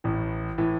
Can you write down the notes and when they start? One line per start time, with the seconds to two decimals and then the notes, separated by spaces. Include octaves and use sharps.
0.04 A1 A2 E3
0.58 A2 E3